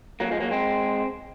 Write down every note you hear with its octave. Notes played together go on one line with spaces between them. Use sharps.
F#3 A#3
F3 G#3
F#3 A#3
G#3 C4